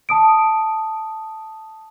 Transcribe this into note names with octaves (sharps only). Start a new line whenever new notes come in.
A5 D#6 D7